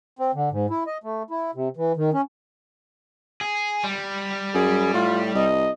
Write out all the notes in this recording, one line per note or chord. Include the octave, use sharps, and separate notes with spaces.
C4
D3
G#2
E4
D#5
A3
E4
C3
E3
D#3
C#4
G#4
G3
F#2 G#4
A2 F4
C2 D#5